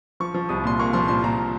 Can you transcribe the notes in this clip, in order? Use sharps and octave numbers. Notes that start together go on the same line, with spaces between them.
F3 C#6
F3
C2 D#6
A#2 C6
A#3 C#6
F3 C6
A#2 C6
A#2 A#5